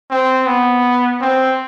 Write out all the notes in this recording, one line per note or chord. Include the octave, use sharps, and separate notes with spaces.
C4
B3
C4